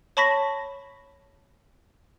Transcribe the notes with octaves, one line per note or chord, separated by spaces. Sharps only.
C#5 A5 B5 C#6 A#6 B6